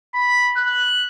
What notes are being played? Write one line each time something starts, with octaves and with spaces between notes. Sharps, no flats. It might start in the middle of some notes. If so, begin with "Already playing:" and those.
B5
F#6